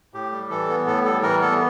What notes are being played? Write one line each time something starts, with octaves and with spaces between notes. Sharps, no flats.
A2 G4
G3
E3 A4
B3
A2 A4
G3 A4
E3 A#4
B3 A4